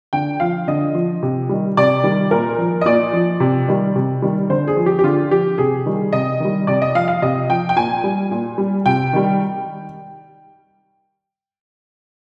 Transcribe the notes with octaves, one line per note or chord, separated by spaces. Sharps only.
D3 G5
F3 F5
D3 D#5
F3
C3
D#3 G3
C3 D5
D#3 G3
A#2 A#4
F3
D#5
A#2 D5
F3
C3
D#3 G3
C3
D#3 G3
D3 C5
G#4
F3
G4
G4
D3 F4
F3 G4
C3 G#4
D#3 G3
C3 D#5
D#3 G3
C3 D5
D#5
F3 F5
F5
C3 D#5
F3 G5
G5
A#2 G#5
G3
A#2
G3
C3 G5
D#3 G3